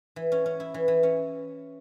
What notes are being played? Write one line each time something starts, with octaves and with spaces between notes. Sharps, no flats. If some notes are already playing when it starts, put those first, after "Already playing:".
E3
C#4
C#4
E4
E3
E3
C#4